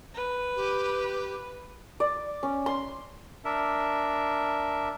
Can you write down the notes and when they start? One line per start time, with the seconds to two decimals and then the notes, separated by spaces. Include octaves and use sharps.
0.14 B4
0.56 G4
2.00 D5
2.43 C#4
2.66 C6
3.45 D4 A#4 E5